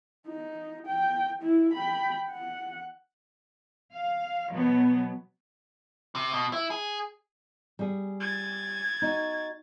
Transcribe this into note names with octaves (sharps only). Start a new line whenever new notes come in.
D#4
G5
E4
G5 B5
F#5
F5
B2 F#3 B3
C3
B2
E4
G#4
G3 G#4
G#6 A6
D#4 F#4